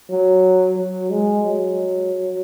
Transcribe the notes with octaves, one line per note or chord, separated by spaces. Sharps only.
F#3
F#3
G#3
F#3